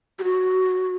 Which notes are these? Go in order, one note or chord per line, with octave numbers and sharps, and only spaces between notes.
G4
F#4